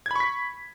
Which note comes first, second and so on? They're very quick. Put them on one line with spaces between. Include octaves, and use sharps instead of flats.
G#6 B5 C#6 B6